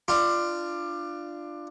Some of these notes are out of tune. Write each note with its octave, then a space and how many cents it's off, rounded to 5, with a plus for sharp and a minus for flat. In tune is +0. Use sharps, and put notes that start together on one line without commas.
D4 +15 F4 -15